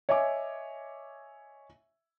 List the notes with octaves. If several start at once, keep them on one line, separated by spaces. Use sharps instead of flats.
C#5 D#5 E5 G#5 D6